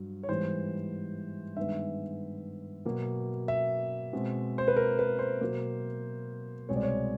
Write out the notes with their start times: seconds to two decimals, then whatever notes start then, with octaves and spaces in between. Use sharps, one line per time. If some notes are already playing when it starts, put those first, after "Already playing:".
Already playing: G2 F#3
0.23 C#5
0.29 G#2 E3 G3 B3 C5
1.56 G2 D#3 G#3 B3 E5
2.85 B2 F#3 A#3
3.48 E5
4.13 B2 G#3 C4
4.58 C5
4.68 B4
4.76 A#4
4.99 B4
5.19 C5
5.41 B2 F#3 A#3
6.69 C2 B2 G#3 C4 C#5
6.76 D5
6.83 C#5